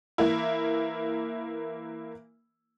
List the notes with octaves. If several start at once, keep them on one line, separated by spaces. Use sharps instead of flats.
E3 A#3 E4